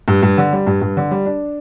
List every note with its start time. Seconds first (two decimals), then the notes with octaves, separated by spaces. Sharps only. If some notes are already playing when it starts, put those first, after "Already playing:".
0.08 G2
0.23 G2
0.38 D3
0.53 G3
0.67 G2
0.81 G2
0.97 D3
1.11 G3
1.26 D4